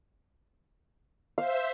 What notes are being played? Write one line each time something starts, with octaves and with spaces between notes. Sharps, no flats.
C5 E5 F5